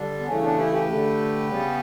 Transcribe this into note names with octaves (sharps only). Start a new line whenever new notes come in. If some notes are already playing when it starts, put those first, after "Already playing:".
Already playing: D3 G3 D4
B3
C#3 E3 A3 C#4
B3 D4
E4 G4
G4 B4
D3 A3
C#3 G3 B3